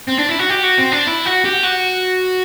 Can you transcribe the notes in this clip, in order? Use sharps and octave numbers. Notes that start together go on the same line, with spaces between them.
C4
D4
E4
F#4
G4
F#4
C4
D4
E4
F#4
G4
F#4